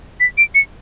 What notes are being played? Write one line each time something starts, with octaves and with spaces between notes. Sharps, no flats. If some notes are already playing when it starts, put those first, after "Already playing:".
B6
D7
C#7